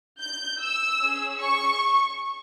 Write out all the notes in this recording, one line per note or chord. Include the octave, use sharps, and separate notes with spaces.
G6
E6
C#4 G#4
C#6